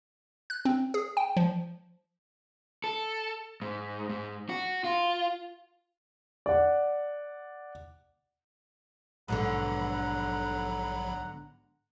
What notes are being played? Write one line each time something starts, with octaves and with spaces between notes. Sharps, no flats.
F#6
C4
G#4
G5
F3
A4
G#2
G#2
F#4
F4
D5 F#5
A#1 G#2 B2 D3 F#3 F#5 A#5 B5